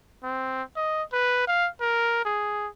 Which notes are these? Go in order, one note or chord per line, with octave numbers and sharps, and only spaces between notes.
C4
D#5
B4
F5
A#4
G#4